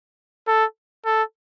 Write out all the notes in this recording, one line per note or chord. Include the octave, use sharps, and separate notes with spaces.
A4
A4